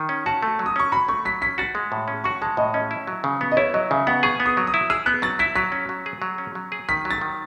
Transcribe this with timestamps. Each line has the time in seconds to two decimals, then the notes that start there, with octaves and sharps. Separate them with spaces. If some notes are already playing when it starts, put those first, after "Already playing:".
Already playing: D#3
0.09 C#4
0.26 F#4 A5
0.43 A3
0.59 F#3
0.66 D#6
0.76 C#4 C#6
0.92 F#4 B5
1.08 A3 C#6
1.25 F#3 B6
1.42 C#4 B6
1.58 F#4 A6
1.75 G#3
1.92 A2
2.08 C#4
2.24 F#4 C#6
2.41 G#3 A5
2.57 A2 D#5
2.74 C#4 D#5
2.91 E4
3.07 F#3
3.24 C#3
3.41 B3
3.51 D#5
3.57 E4 C#5
3.74 F#3 D#5
3.91 C#3 E5
4.07 B3 F#5
4.23 G#4 C#6
4.40 B3
4.46 D#6
4.57 F#3
4.67 D#6
4.74 E4
4.90 G#4 E6
5.06 B3 F#6
5.22 F#3 A6
5.39 E4 B6
5.56 F#3 B6
5.72 C#4
5.89 F#3
6.06 G#4
6.22 F#3
6.38 C#4
6.55 F#3
6.72 G#4
6.89 D#3 B6
7.05 F#3
7.11 A6
7.21 D#3